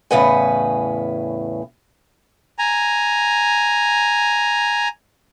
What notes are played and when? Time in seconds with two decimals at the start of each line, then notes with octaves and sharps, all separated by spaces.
0.11 E2 A2 C#3 B4 F#5 G#5
2.59 G#5 A#5